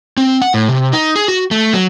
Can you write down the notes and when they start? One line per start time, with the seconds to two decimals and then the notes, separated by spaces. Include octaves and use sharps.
0.17 C4
0.42 F#5
0.54 A2
0.69 C3
0.93 D#4
1.15 G#4
1.28 F#4
1.51 A3
1.73 F#3